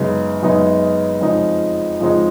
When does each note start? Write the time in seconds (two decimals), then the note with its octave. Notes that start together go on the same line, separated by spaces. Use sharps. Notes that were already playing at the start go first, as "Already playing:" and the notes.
Already playing: F#2 C#3 G#3 B3 D#4
0.42 F#2 C#3 G#3 B3 D#4
1.21 F2 C#3 F3 G#3 D#4
2.00 F2 C#3 F3 G#3 D#4